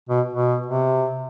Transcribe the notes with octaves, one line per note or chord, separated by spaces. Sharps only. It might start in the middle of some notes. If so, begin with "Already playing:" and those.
B2
B2
C3